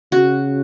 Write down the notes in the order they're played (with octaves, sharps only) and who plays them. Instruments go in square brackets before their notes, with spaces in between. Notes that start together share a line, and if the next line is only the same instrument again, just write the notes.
[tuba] C#3 [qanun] F#4